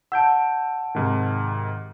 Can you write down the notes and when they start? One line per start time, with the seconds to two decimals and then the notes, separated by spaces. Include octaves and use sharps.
0.12 F#5 A5 E6 G6 D7
0.95 G#2 C3 D#3